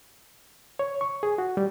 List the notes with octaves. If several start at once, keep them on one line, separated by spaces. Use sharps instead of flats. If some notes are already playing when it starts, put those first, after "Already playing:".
C#5
C#6
G#4
F#4
G3